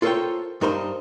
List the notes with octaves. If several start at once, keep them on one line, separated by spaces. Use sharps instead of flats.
F4 A4 A#4 C5 C#5 G5
G2 D#4 A#4 C5 A#5 C6